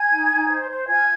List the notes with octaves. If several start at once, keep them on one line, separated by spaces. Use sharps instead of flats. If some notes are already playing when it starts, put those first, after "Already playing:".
Already playing: G#5 G#6
D#4
D#4
C5
C5
F4 G#5 G#6